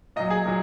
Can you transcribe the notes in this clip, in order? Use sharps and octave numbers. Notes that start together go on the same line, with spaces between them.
A#2 F#3 D#5
G#4
A#2 F#3